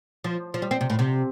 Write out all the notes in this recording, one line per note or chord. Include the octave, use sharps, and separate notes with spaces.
F3
F3
G3
C4
C3
A2
C3